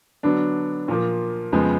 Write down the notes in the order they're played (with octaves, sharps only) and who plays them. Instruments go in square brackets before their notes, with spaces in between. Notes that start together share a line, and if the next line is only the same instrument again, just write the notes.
[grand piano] D3 F#3 B3 D4
A#2 F3 A#3
F2 C#3 F3 G#3 B3